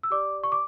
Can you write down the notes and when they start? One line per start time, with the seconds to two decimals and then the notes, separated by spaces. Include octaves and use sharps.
0.03 E6
0.10 G4 D5 D6
0.44 C#6
0.52 D6